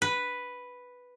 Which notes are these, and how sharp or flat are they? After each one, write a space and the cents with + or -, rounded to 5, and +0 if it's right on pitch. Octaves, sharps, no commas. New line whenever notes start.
B4 +0